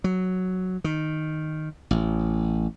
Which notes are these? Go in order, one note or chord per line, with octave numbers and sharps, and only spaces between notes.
F#3
D#3
A1